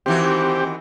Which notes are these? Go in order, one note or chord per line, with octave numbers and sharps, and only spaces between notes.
D#3 E3 C4 F#4 G4